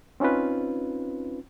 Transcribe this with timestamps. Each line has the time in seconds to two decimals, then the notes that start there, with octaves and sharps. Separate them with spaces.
0.20 C4 C#4 D#4 F4 B4